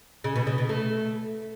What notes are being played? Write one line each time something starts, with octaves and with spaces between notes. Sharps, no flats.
C#3
B2
C#3
B2
A3